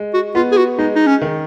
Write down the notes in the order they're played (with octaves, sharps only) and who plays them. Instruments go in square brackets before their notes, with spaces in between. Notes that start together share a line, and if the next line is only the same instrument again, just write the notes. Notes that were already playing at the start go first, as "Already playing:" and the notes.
Already playing: [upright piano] G#3
[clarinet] F#4
[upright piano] B3 [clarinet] F4
[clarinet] G#4
F#4
[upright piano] G#3 [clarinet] D#4
[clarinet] D#4
C#4
[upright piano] D#3